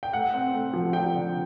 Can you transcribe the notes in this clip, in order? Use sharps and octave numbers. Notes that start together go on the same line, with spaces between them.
G5
A3 F#5
C4
A3
F3
F3 G5
D3